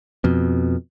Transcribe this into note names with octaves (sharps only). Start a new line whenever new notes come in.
F2 B2